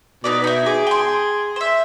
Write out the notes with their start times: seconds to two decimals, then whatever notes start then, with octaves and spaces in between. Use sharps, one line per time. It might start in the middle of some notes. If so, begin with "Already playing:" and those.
0.24 B2 D#4 B4 D5
0.44 D#4 E4
0.66 G#4 D6
0.87 G5 C6
1.56 C5 E5